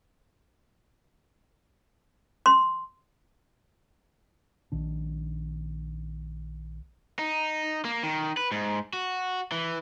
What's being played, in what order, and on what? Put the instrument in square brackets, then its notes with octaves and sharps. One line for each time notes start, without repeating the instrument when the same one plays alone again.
[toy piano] C6
[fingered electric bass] A#1 D#3 D4
[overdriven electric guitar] D#4
A#3
D#3
B4
G#2
F#4
E3